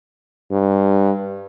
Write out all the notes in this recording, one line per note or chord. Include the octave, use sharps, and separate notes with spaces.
G2